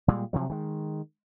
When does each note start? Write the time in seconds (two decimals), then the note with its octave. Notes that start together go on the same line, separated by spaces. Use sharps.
0.08 A#2 G3 G#3
0.33 C3 F3 F#3
0.50 D#3 G#3